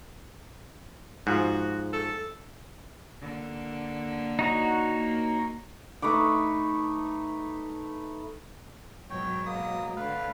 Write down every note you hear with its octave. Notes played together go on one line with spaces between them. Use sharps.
G#2 F3 F#4
A4
D3 A#3
D#4 F#4 C#5
A#3
A3 D#4 B4 D6
G#2 B2 F#3 C#5 G5
A#3 D#6
D3 A3 B4 F5